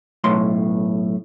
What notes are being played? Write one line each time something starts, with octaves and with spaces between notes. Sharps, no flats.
B1 A2 C6